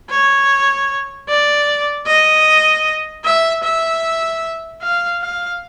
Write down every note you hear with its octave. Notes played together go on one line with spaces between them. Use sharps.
C#5
D5
D#5
E5
E5
F5
F5